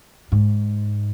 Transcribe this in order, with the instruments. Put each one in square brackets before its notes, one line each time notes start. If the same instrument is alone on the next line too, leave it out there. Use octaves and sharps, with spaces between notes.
[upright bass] G#2